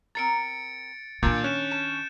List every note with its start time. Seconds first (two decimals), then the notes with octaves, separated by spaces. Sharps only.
0.15 C4 A#4 A#5 A6 C#7 D7
1.23 A#2 D#3 A#3 D4 A5 G6 A6
1.44 C#4 F#6 E7
1.71 A5 E7